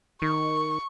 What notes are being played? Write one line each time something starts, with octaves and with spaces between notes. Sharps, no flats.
D#3 C#6